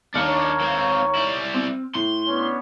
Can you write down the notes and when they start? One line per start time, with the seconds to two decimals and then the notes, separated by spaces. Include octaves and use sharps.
0.15 D#2 D4 D#4 A#4 C#5 F6 C#7
0.61 A#3 C4
1.15 G3 E4
1.54 C4
1.95 A2 C6
2.27 B3 C#4 D4